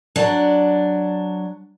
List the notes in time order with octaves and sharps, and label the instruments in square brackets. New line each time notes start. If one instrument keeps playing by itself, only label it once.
[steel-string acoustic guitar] F#3 D4